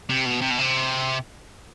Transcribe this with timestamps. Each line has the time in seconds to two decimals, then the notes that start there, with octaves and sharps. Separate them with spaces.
0.09 C3
0.26 B2
0.41 C3
0.51 B2
0.59 C3